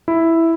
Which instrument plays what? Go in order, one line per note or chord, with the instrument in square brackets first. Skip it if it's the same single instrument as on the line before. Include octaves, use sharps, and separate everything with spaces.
[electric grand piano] E4